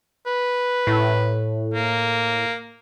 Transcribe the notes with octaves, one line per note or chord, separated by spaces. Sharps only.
B4
A2
A#3